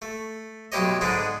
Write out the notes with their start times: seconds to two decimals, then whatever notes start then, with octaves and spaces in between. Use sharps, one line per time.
0.02 A3
0.72 B1 G2 E4 G4 C#5 D#5
1.01 G#2 D3 G#3 B3 D4 D#4